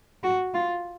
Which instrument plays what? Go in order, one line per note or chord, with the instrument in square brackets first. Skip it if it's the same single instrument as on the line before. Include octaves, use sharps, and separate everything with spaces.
[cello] F#4
F4